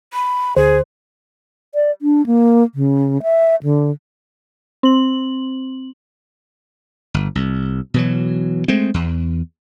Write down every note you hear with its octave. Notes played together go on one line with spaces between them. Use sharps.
B5
D2 G#4 C5
D5
D4
A#3
C#3
E5
D3
C4 F#7
G1
C2
B2 E3 F#3
G#3 A3 C4
E2